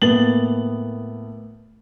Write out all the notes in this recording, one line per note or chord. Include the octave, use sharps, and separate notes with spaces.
A2 A#3 B3 A6 F#7